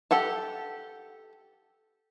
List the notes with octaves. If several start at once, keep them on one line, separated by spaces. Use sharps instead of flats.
G4 A4 F#5 A5